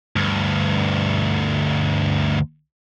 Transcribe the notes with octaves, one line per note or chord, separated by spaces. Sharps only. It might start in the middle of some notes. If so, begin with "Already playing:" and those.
D2 G2